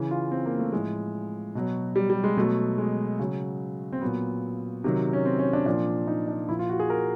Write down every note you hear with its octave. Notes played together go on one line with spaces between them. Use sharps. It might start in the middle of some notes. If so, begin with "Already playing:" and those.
Already playing: C#3 E3
F4
C4
A#3
A3
A2 F3 G#3
B2 F#3
G3
G3
G#3
B2 F#3 A3
G#3
C#3 F#3
C4
A#2 F#3 B3
C3 D#3 F#3
C#4
C4
C#4
D4
A#2 F3 D4
D#4
D4
A#2 F3 E4
F4
F#4
G#4
A#4